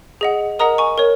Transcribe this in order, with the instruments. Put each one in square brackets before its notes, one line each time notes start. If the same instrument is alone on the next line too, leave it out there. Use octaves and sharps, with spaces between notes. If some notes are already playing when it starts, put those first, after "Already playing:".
[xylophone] G#4 D#5 F#5
A#4 D#5 F#5 A#5 D#6
G#5 C#6
A#4 C#5